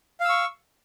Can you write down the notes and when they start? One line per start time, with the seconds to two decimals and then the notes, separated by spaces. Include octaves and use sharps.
0.20 F5
0.25 E6
0.29 C#6